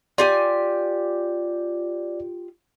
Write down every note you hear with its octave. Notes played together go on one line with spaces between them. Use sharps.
F4 G4 D5 G#5